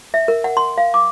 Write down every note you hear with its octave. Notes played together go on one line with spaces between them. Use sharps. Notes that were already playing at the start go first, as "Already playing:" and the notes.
E5
A#4
F#5
C6
F5
D6